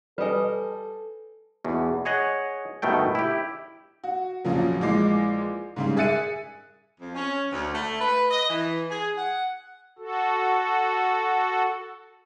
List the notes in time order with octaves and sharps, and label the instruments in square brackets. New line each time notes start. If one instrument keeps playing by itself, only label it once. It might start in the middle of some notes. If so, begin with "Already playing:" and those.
[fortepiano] G3 D#5 [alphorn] A4 [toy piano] B4 G#5
[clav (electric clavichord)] E2 B2
G#4 C#5 D#5 F#5
G1 B2 D#3 A3 G5
E4 G4
[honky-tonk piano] F#4
A#1 F2 C#3 F3 F#3
A#1 E3 G#3 D6 C7
G#2 C#3 G3
G#4 E5 F#6 A6 C#7 D#7
[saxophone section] F2
C#4
D2
A3
B4
D#5
E3
G#4
F#5
[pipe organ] F#4 A4